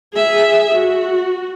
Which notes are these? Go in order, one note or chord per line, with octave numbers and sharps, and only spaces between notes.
G#4 E5
F#4